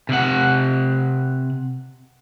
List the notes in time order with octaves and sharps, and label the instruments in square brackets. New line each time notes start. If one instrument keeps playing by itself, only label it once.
[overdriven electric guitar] C3 F#5